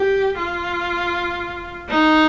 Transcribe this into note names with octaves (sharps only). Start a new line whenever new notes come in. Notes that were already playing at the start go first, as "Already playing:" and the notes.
Already playing: G4
F4
D#4